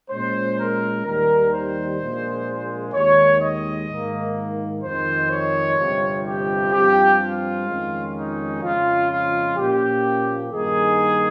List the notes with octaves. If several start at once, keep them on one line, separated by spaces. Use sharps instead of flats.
A#2 G#3 C#4 C5
A#4
D#2 D#3 G3 A#4
C5
A#1 A#2 G#3
D#2 D#3 G#3 C#5
D#5
G#2 D#3 A#3
F2 D#3 G#3 C5
C#5
G1 F2 C3 F3 C4
G4
G2 F3 C4 G4
F4
F2 D#3 G#3 C#4
D#4
F2 C#3 F3 G#3 F4
F4
A#2 F3 A#3 C#4 G4
G2 D#3 A#3 D#4 G#4